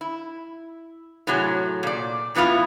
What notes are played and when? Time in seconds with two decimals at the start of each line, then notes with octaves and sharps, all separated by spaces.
0.01 E4
1.27 A2 C3 F#3 G#4
1.83 A#2 D5
2.35 A2 E3 B3 E4 F4